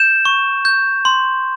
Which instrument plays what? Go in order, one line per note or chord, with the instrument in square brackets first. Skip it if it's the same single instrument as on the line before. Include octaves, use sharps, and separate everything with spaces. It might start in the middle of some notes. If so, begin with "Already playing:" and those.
Already playing: [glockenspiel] G6 E7
C#6
G6
C6